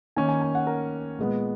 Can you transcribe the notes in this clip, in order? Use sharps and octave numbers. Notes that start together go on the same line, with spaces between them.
D#3 A#3 C#4 G#5
G#5
G#5
F#5
A#4
A#2 G#3 B3